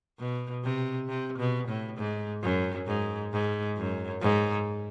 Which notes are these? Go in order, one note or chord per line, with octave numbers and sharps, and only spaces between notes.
B2
C3
C3
B2
A2
G#2
F#2
G#2
G#2
F#2
G#2